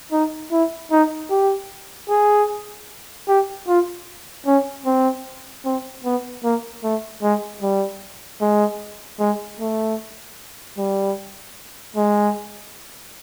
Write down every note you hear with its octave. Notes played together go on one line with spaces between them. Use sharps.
D#4
E4
D#4
G4
G#4
G4
F4
C#4
C4
C4
B3
A#3
A3
G#3
G3
G#3
G#3
A3
G3
G#3